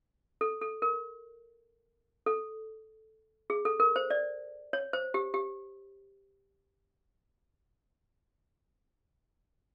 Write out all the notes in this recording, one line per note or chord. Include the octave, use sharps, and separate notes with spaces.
A4
A4
A#4
A4
G#4
A4
A#4
C5
D5
C#5
C5
G4
G4